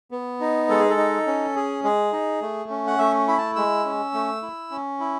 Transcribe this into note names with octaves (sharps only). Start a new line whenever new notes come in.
B3
D#4
G#3 A4
G#4
A4
D#4
C#4
G#4
G#3 G#4
D#4
A3
C#4
F#5
A3 E5
E4 B5
A5
G#3 E6
C#4
A3
E4
C#4
E4